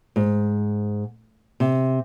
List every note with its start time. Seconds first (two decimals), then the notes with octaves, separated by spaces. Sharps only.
0.16 G#2
1.60 C3